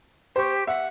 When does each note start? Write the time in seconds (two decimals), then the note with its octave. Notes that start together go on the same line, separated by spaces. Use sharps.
0.36 G4 C5 C#6
0.67 E5 F#5